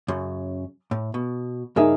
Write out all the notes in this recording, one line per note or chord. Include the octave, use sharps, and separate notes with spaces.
F#2 C#3
A2
B2
G2 C#3 D#4 G#4 A#4 E5